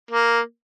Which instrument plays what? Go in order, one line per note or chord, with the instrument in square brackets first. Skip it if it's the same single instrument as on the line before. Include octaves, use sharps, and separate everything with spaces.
[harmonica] A#3